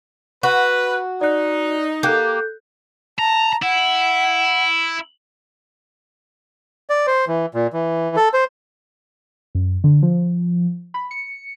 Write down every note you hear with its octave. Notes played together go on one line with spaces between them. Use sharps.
F#4 B4
D#4 D5 F#6
A#3 G4 A4 F#6 G6
A5 A#5
E4 F#5
D5
C5
E3
A#2
E3
A4
C5
F#2
D3
F3
B5
C#7